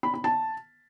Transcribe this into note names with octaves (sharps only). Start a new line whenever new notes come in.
B5
B5
A5